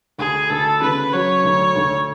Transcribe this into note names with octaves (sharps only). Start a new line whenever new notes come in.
D2 G#4
D2 A4
C#3 B4
F#3 C#5
D2
D2